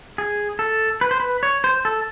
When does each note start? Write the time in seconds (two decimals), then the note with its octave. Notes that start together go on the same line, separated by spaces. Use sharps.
0.18 G#4
0.59 A4
1.01 B4
1.11 C5
1.20 B4
1.43 C#5
1.64 C5
1.85 A4